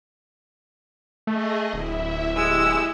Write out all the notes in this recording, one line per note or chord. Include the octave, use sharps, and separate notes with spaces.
A3 G#4 D#5
D1 E4 E5
G#3 E4 G4 E6